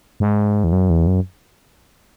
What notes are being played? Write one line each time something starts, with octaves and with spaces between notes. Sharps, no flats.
G#2
E2
F#2
E2
F#2